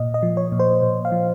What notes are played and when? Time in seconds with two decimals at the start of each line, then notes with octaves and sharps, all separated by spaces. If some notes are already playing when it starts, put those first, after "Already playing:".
Already playing: A#2 D#5
0.14 D#5
0.23 F3
0.37 C#5
0.52 A#2
0.60 C5
0.82 A#2
1.05 F5
1.12 F3